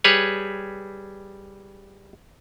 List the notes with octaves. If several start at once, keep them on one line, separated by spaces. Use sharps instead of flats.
G3 G#4 B4 C#5